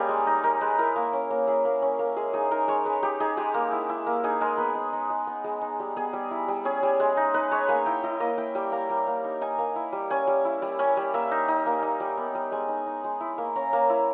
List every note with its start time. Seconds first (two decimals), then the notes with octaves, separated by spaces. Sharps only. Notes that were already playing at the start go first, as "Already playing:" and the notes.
Already playing: G3 A#3 C#4 D#4 G#4 D#5
0.09 G#3
0.27 D#4
0.44 D#4 A#4
0.61 G#3 B4
0.78 E4 A#4
0.96 A#3
1.13 C#4
1.30 A#3
1.47 E4 G#4
1.65 A#3
1.82 C#4
1.99 A#3
2.16 G#3 G#4
2.33 D#4 G#4
2.51 D#4 A#4
2.68 G#3 C#5
2.85 G#3 B4
3.03 D#4 G4
3.20 D#4 G#4
3.37 G#3 G4
3.54 A#3
3.72 E4
3.89 E4
4.07 A#3
4.24 D#4 G#4
4.41 G#3 A#4
4.58 B3 B4
4.75 G#3
4.93 D#4
5.10 G#3
5.27 B3
5.44 G#3
5.61 D#4
5.80 G3
5.97 B3 G#4
6.13 G3
6.31 E4
6.48 G3
6.65 C#4 G#4
6.83 G3
7.00 G#3
7.17 D#4
7.34 D#4 B4
7.51 G#3 C#5
7.69 A#3 G#5
7.86 E4 G5
8.04 E4 D#5
8.20 A#3 D#5
8.38 E4 G5
8.55 G3 G5
8.72 A#3 A#5
8.90 G3
9.07 A#3
9.24 D#4
9.41 D#4 G#5
9.58 A#3
9.76 E4
9.93 G3
10.10 C#4 G#5
10.27 G3
10.45 E4
10.62 G3
10.79 C#4 G#5
10.97 G3
11.14 A#3 E5
11.31 D#4
11.48 D#4
11.66 A#3
11.82 D#4
12.00 G3
12.18 B3
12.35 G3
12.52 G#3 G#5
12.69 D#4
12.86 D#4
13.04 G#3
13.21 E4
13.38 A#3
13.56 C#4 A#5
13.73 A#3
13.90 E4